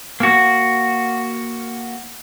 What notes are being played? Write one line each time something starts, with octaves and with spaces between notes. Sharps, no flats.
A#3 F#4